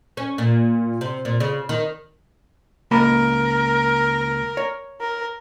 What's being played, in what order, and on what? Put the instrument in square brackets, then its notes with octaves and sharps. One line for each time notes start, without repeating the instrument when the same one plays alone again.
[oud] C#4
A#2
C3
A#2
C#3
D#3
[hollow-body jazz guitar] C#2 A#3 B5 [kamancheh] A#4
[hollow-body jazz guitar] C#5
[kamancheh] A#4